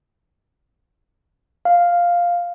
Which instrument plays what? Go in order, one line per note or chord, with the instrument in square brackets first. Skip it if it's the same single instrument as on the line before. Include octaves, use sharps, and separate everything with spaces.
[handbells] F5